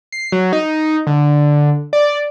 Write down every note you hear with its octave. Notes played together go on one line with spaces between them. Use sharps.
C7
F#3
D#4
D3
D5